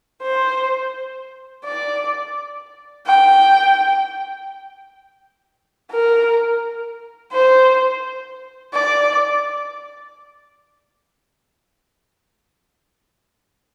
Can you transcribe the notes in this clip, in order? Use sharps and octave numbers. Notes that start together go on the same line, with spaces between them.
C5
D5
G5
A#4
C5
D5